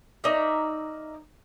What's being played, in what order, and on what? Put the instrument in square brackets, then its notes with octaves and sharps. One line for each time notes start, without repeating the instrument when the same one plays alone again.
[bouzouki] D#4 A#4 D5 E5